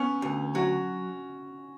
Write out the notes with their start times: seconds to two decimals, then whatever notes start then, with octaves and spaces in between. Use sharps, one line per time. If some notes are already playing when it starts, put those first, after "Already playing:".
Already playing: B3 C#4
0.22 D2
0.55 F#3 F#4